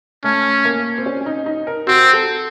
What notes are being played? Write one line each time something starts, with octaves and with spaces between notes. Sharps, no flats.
A3 C#4
A#3
C4
C#4
C#4
D#4
D#4
A#4
C4 F#4
A4